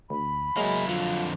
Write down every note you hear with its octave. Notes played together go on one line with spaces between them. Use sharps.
D2 B5
F#3 G#3 A#3 E4
F2 D3 F4